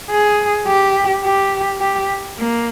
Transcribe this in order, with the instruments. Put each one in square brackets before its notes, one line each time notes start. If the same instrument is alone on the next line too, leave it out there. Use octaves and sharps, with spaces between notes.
[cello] G#4
G4
G4
G4
A#3